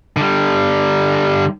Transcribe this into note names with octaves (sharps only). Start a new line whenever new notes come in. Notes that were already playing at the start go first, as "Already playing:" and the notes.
D3 G3